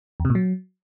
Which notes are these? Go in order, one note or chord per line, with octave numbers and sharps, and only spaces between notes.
E2
C3
A#2
F#3